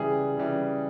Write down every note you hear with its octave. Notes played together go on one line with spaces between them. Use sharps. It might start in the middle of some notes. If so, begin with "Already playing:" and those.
Already playing: C#3 E3 G3 G#4
C#3 E3 G3